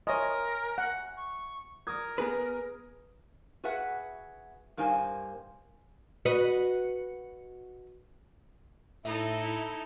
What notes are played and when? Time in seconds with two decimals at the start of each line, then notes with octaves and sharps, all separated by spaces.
0.07 A#4 C#5 D#5 E5 G#5 C6
0.78 F#5
1.17 C#6
1.87 A#4 D#6 G#6
2.18 B3 G#4 B4
3.64 F#4 G#4 B4 E5 F#5
4.77 G2 A#3 D#4 C5 G#5
6.25 F#4 B4 D#5
9.05 A2 D#4 E4 A4 E5